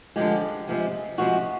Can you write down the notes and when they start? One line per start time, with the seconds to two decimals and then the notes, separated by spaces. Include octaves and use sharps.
0.16 D3 F3 G#3 G4
0.67 C3 F3 G#3
1.18 C3 F3 G#3 F#4